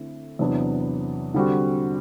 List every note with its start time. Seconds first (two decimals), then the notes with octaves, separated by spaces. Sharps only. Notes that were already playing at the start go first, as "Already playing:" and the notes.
Already playing: D3 A3 C4 E4
0.39 E2 C3 F#3 B3 D4
1.34 D3 G3 C4 F#4